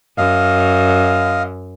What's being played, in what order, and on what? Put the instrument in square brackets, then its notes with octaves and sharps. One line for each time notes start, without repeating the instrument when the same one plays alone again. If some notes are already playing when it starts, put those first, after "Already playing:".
[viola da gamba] F#2 [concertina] D#5 F5